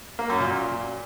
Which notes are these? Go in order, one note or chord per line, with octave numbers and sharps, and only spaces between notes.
A#3
F#2
A#2